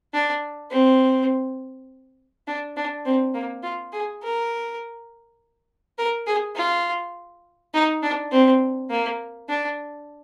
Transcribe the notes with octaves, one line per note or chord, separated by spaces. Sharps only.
D4
C4
D4
D4
C4
A#3
F4
G#4
A#4
A#4
G#4
F4
D#4
D4
C4
A#3
D4